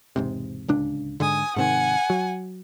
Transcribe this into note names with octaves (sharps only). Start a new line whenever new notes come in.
E1 G#2 C3
D1 C#2 D4
G#2 D3 G#5 D#6
G#2 C3 D#3 F#5 G#5
F#3